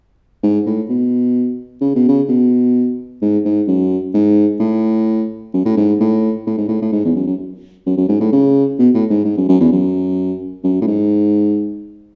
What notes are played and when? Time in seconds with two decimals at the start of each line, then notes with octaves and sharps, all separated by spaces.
0.43 G#2
0.66 A2
0.89 B2
1.81 C#3
1.95 B2
2.08 C#3
2.29 B2
3.22 G#2
3.45 G#2
3.67 F#2
4.14 G#2
4.60 A2
5.54 F#2
5.65 A2
5.77 G#2
6.00 A2
6.47 A2
6.57 G#2
6.68 A2
6.82 A2
6.92 G#2
7.05 E2
7.16 F#2
7.27 F#2
7.86 F#2
7.97 F#2
8.08 G#2
8.20 A2
8.32 C#3
8.79 B2
8.94 A2
9.10 G#2
9.25 G#2
9.37 F#2
9.49 F#2
9.60 E2
9.72 F#2
10.64 F#2
10.81 A2
10.87 G#2